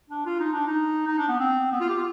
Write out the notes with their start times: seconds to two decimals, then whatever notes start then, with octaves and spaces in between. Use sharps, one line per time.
0.10 D4
0.26 F4
0.40 D#4
0.53 D4
0.67 D#4
1.07 D#4
1.18 D4
1.29 B3
1.40 C4
1.72 B3
1.81 F4
1.89 G4
1.97 F4